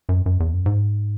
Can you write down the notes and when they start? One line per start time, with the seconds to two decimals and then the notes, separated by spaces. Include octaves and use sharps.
0.09 F#2
0.26 F#2
0.40 E2
0.53 F#2
0.66 G#2